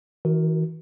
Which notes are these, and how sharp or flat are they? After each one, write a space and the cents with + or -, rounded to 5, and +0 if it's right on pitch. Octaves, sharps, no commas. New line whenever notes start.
E3 -45 F#4 +0 A#4 +0